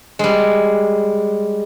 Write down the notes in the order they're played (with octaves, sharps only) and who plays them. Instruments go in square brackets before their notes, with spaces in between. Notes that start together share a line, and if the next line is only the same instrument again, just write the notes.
[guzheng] G3 G#3